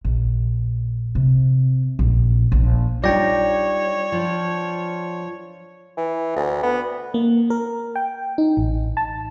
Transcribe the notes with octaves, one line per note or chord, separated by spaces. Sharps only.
A#1
C3
A#1
A#1
G3 D4 D#4 F4 C#5 D5 G5 A#6
F3
E3
D2
B3
A#3
A#4
G5
D#4
A1
A5